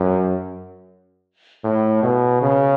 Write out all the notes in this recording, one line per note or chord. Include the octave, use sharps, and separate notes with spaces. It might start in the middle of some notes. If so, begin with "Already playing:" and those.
Already playing: F#2
A2
B2
C#3